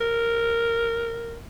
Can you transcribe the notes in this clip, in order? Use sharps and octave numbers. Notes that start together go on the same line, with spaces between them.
A#4